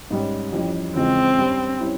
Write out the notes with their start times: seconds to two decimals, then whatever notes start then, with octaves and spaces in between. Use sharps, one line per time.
0.11 G#2 G3 C#4
0.53 F2 E3 G3 C#4
0.95 E2 C#3 F3 G#3 C4
1.38 G2 G3 C#4
1.80 G3 C#4 E4